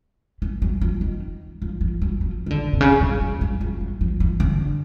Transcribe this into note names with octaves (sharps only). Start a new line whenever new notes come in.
E3
F#3
F3
D#3
F3
F3
F#3
F3
D#3
D3
C3
C#3
F#3
F3
F#3
F3
F#3
F3
E3
D3